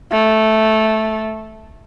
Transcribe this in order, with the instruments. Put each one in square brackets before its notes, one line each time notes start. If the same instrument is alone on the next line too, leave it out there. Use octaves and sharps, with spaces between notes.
[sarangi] A3